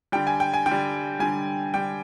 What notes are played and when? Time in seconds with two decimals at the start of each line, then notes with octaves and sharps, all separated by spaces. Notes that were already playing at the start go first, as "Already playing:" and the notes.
0.12 D3 G3 G5
0.27 G#5
0.40 G5
0.54 G#5
0.66 D3 G5
0.71 G3
1.19 D3 G3 G#5
1.74 D3 G3 G5